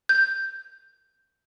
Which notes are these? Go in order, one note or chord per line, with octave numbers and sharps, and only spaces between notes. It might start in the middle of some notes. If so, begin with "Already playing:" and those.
G6